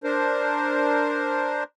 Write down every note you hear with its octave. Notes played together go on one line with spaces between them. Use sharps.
D4 A#4 C5